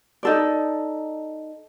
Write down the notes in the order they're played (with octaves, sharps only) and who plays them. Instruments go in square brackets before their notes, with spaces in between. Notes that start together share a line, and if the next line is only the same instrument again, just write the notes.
[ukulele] D#4 A4 D5